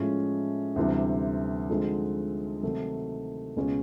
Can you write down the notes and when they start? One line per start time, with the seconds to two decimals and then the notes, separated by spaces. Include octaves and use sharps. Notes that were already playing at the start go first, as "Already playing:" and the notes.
Already playing: A2 F3 G#3 C#4
0.76 D2 C3 E3 G3
1.70 D3 F3 G#3 C4 D#4
2.63 C3 D#3 F#3 A3
3.57 C#2 B2 G#3 C#4